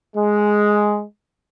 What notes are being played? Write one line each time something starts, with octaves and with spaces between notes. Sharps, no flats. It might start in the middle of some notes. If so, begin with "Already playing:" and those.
G#3